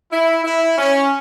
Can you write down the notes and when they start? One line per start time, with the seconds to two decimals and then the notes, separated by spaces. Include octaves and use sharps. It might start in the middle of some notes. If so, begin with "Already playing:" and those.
0.11 E4
0.44 E4
0.78 C#4